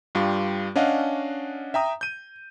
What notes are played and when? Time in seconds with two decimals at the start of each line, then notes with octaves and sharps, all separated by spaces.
0.15 G2 G3 F4 G4
0.76 C#4 D4 D#5 F5 F#5
1.74 E5 G5 A#5 D#6
2.01 G6 D#7